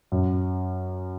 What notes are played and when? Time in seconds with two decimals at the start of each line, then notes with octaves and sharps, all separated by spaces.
0.12 F#2